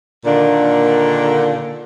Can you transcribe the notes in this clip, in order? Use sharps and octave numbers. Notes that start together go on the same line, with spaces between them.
A#2 D3 D#3 A#3 D4